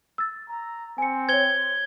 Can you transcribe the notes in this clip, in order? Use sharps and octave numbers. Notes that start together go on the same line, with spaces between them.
E6 A6
A#5
C4 G#5 C#7
C5 C#5 G#6 G7